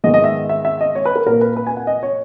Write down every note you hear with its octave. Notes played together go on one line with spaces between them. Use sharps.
G#2 D#3 G#3 B3 D#5
D#5
E5
E5
E5
D#5
C#5
B4
A#4
A#2 A#3 A#4
B4
B4
G#5
F#5
D#5
C#5